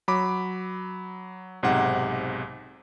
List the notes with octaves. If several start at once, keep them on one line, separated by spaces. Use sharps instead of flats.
F#3 B5 D6
B1 G#2 C3 F#5